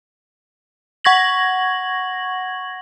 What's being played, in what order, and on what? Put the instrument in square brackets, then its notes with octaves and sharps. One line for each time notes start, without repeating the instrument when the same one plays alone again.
[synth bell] F#5 C#6 G#6 A#6 F#7